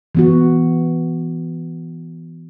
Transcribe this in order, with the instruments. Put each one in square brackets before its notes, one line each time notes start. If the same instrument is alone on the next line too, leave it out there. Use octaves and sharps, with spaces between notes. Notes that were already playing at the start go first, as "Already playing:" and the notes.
[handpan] E3 B3 F#4